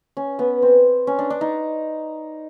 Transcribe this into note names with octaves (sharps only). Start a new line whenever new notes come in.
C#4
B3
C4
C#4
D4
D4
D#4